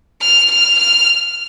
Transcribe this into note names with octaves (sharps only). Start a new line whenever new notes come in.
F6
F6
F6